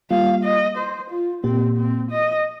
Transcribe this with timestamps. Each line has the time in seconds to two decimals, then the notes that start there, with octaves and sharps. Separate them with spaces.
0.11 G3 A#3 F4 F5
0.44 D#5
0.77 C5
1.10 F4
1.44 A#2 A#3 C4 G4
1.77 C4
2.11 D#5